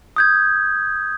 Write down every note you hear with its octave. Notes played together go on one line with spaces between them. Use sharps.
D#6 G6 G#6